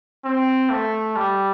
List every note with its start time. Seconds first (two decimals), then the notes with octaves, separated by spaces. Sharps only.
0.24 C4
0.70 A3
1.16 G3